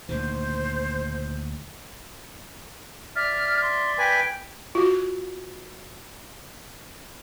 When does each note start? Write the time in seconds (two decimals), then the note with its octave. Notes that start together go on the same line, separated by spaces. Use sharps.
0.09 D2 A#2 D#3 C5
3.16 D5 E5 F6
3.62 C6
3.98 B4 G5 G#5
4.75 F4 F#4